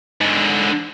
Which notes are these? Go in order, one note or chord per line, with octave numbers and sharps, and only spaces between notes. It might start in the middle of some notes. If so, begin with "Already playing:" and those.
G#2 D3